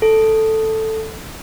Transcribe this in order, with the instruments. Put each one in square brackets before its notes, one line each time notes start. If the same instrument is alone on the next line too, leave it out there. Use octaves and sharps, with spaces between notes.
[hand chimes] A4